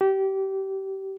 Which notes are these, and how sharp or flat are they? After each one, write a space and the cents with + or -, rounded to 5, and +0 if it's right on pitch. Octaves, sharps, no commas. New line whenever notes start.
G4 -25